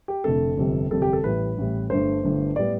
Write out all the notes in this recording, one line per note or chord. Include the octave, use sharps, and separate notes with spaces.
G4
F1 F2 D3 A3 C4 A4
G1 F2 C3 G3
G1 F2 C3 G3 A4
G4
A4
A1 A2 G3 B4
A1 A2 G3
G1 G2 D3 A3 C5
G1 G2 D3 A3
A2 G3 B3 D5